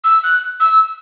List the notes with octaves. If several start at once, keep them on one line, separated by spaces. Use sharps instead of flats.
E6
F#6
E6